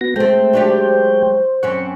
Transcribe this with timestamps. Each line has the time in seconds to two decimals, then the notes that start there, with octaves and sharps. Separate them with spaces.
0.01 B3 F#4 A#6
0.16 G#3 A3 C4 C5 G5
0.53 F#3 D4 G4
1.63 F#2 C4 C#4 F#5 C#6